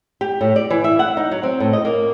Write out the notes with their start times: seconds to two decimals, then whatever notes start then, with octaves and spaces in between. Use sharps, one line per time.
0.21 G4
0.41 A2
0.56 D5
0.70 E3
0.84 E5
0.99 F#5
1.17 D#4
1.31 F#3
1.43 C4
1.60 A2
1.73 D#5
1.85 A#3